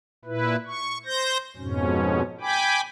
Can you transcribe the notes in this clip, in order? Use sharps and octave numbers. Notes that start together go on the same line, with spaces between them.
A#2 E4 B4
C#6
C5 G6 A#6
F2 G#2 B2 C#4
G5 G#5 B5 D6